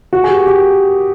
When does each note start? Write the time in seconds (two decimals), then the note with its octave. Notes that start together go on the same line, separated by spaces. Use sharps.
0.13 F#4
0.24 G#4
0.29 G4
0.46 G4